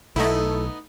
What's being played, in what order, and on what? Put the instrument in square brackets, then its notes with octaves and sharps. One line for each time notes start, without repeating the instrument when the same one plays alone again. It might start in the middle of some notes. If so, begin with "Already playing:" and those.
[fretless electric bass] B1 [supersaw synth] A3 E4 [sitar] B3 D#4 D#5 [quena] A4